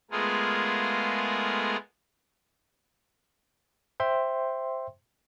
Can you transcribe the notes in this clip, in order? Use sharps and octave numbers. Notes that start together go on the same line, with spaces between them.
G#3 A3 B3 F4 G#4 A#4
C5 E5 G5 C6